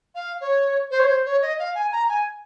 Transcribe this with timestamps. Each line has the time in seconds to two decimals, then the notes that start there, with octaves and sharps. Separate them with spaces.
0.15 F5
0.41 C#5
0.91 C5
0.99 C#5
1.07 C5
1.25 C#5
1.42 D#5
1.59 F5
1.75 G#5
1.92 A#5
2.09 G#5